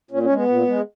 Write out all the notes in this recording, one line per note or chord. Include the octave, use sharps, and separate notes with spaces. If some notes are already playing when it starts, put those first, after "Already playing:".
A#2 C#4
C#4
G#3
B3
A#2
G#3